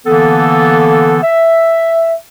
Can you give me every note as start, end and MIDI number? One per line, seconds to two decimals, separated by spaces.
0.07 1.18 50
0.07 1.18 52
0.07 1.18 58
0.07 1.18 59
0.07 1.18 69
1.23 2.13 76